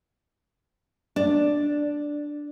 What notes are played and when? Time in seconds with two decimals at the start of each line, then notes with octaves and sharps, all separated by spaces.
1.16 D4